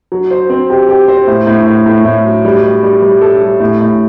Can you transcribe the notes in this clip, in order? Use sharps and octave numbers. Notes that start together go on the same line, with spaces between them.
F#3
C5
C4
G4
G4
C5
A2
A2
A2
A2
A2
F#3
G3
G3
G3
G3
A4
G3
A2
A2